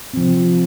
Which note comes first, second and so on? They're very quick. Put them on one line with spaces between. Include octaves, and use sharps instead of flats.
C4 F3 C3